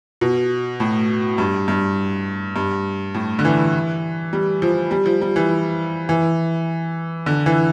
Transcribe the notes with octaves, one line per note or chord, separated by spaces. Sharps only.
B2
A2
G2
G2
G2
A2
D3
E3
G3
F3
G3
F3
G3
E3
E3
D3
E3